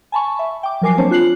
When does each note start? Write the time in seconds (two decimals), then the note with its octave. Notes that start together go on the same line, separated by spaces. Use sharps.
0.12 G#5 A5 B5 C#6
0.39 E5
0.63 G5 D6
0.82 F3 F#3 A#4 G#5 D6 C7
0.98 A#3 C4 D4 C5 C#5 A5
1.11 F4 F#6 C7 F#7